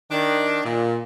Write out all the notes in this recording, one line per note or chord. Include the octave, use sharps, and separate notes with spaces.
D#3 D4
A#2